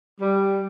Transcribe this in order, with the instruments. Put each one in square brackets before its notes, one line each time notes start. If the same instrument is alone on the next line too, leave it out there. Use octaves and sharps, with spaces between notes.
[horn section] G3